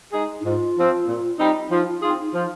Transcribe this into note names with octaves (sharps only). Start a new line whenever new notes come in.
G#3 D#4 G#4
D#4
G#2 F4
F3 C4
A#2
G3 C4 D#4
F3 D#4
F4
C4 D#4 F4 G#4
D#4
F3 F4